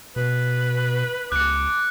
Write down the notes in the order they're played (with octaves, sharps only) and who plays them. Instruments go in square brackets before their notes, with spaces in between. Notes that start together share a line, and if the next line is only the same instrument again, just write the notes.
[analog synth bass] B2 [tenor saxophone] B4
[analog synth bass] C#2 [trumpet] D6 [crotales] F#6 C#7